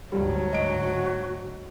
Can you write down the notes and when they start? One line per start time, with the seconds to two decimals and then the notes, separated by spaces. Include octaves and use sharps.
0.12 D2 G#2 F#3 G3
0.53 F#4 D#5 D7